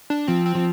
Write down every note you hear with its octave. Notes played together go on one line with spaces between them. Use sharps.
D4
F3 C4
C4
F3